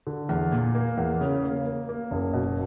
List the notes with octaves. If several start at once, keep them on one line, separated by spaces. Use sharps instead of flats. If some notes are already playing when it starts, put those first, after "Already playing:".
D3
E2
A#2
A#3
E2
C#3
A#3
A#3
A#3
F#1
B2